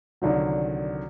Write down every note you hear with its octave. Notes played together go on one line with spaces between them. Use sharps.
C2 D3 D#3 F#3